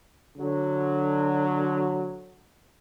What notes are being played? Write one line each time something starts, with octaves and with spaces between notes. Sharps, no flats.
D3 F#3